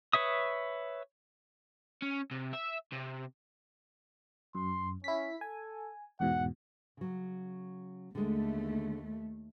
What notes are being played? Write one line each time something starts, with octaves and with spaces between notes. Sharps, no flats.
B4 C#5 E5 D#6
C#4
C3
E5
C3
F#2 C6
C#4 E4 B6
A4 G#5
E2 G#2 B2 F#5
C#3 F#3
D#2 D3 G#3 A3